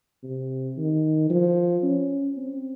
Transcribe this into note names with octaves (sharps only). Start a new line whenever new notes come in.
C3
D#3
F3
C#4
C4